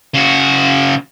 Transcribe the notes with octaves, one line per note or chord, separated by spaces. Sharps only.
C#3 F#4